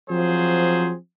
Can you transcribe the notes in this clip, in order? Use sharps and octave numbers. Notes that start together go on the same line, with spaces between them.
F3 F#3 C4 G#4 C5